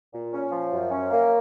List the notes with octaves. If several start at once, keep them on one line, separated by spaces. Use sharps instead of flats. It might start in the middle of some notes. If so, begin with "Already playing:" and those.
A#2
C#4
F3
F#2
C#4
A#3